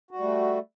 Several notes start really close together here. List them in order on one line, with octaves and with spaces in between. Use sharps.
F#4 G3 A3